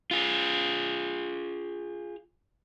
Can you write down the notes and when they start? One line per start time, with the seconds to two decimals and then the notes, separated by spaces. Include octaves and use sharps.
0.11 F4 G#4